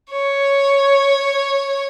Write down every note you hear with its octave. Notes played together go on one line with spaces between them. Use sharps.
C#5